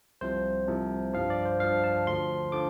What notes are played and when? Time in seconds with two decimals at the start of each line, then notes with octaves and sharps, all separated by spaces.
0.21 C2 C3 F3 C5
0.68 C2 C3 F3
1.14 G2 F3 F5
1.30 D5
1.45 C5
1.60 G2 F3 F5
1.84 A5
2.07 D2 D3 F3 C6
2.52 D3 F3 D6